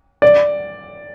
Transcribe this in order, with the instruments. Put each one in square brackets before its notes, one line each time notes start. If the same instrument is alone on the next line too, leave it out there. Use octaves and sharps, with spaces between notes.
[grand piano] D5